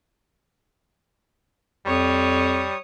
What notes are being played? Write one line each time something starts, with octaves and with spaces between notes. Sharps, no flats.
F2 G3 C#5 D#6